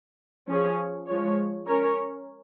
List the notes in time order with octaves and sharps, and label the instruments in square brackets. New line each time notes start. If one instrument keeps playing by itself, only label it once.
[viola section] F3 C#4 G#4 C#5
F3 G#3 F4 C#5
C#4 A#4 C#5